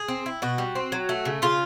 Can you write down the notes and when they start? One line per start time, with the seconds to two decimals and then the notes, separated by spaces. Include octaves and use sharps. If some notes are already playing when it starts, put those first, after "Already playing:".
Already playing: G#4
0.08 C4
0.26 E4
0.42 B2 F#4
0.58 G3
0.75 C4
0.92 F#3
1.09 A3
1.25 C#3
1.42 C#3 F4